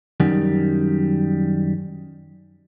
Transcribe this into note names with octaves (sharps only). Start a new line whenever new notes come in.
F#2 D#3 G3